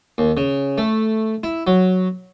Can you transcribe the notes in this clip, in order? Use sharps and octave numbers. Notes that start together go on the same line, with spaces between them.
D#2
C#3
A3
E4
F#3